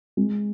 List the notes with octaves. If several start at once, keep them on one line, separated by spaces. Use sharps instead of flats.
G#3